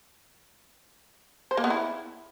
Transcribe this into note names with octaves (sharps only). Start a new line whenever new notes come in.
C5
A#3
B3
E4